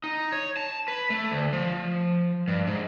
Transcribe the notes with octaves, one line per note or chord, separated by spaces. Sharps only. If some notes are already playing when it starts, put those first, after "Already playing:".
D#4
C#5
A5
B4
A3
D2
F3
G2
G#2